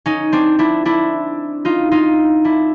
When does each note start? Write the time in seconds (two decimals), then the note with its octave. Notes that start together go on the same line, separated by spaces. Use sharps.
0.06 C#4 D#4
0.32 C4 D4
0.59 D4 E4
0.85 D4 E4
1.65 D#4 F4
1.91 D#4 F4
2.44 D4 E4